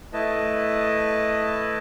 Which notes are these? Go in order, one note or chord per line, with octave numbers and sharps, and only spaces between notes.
A3 E4 B4 D#5 A5